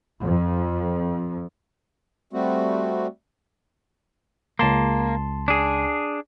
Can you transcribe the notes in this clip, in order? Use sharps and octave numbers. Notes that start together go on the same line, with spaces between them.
F2
G3 A3 C4 F#4
C#2 A#3 A5 C6
D4 G#4